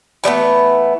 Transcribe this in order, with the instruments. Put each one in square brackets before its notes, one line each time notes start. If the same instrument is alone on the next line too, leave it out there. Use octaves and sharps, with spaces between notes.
[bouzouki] E3 G3 A3 B3